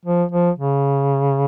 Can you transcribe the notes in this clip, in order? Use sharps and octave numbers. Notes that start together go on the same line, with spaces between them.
F3
F3
C#3